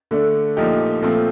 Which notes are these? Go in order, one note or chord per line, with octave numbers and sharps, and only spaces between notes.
D3 A3 D4
A#2 F3 A3 D#4 G4
A#2 F3 A3 C4